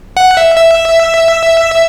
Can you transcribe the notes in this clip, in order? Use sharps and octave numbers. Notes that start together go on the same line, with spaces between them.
F#5
E5
E5